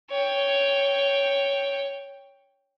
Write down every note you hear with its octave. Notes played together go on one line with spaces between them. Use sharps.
C#5 G5